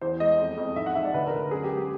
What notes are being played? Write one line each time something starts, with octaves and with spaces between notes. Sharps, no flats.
E2 C5
G#3 D#5
F2
F2
G#2 E5
F#5
G#2 E5
D5
D2 B4
A#4
D2
F#2 G#4
G4
G#3
G4